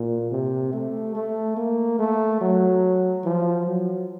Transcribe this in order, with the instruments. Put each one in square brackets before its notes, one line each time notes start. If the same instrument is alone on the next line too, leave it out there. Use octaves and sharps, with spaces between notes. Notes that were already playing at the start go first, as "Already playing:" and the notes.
Already playing: [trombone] A#2
C3
A3
A3
A#3
A3
F#3
F3
F#3